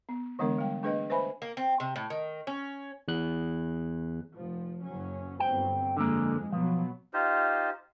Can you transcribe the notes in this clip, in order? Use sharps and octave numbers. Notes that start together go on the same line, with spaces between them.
B3
D3 E3 G#3 B3 D4 A#4
G3 G5
A3 D4 G#4 B4 D#5
B4 C5 E5 G#5 B5
A#3
C4
C3
A2
D#3
C#4
E2 F#6
F1 F3
F#1 F#3 C#4
G1 F#3 C4 G5
F2 D3 G#3 A#3
B2 F3 F#3 B3
D#4 F4 G4 C5